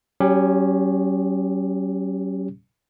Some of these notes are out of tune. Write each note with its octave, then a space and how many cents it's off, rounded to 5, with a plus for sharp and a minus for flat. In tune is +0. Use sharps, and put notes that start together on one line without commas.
F#3 +45 C#4 +0 G4 +15